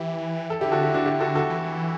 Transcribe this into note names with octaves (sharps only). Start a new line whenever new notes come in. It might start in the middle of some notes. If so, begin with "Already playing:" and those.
Already playing: E3 E4 G4
A4
D3 E4 G4
F#4 A4
E4 G4
D4 F#4
E4 G4
F#4 A4
F#4 A4
E3